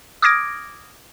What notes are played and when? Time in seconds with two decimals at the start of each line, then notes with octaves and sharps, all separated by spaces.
0.22 D6 D#6 F6 G#6 A#6 D7